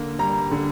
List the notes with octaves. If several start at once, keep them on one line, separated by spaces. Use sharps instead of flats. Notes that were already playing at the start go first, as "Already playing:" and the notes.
Already playing: D3 A#3
G3 A#5
D3